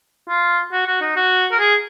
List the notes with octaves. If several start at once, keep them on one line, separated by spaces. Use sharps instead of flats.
F4
F#4
F#4
D#4
F#4
A#4
G#4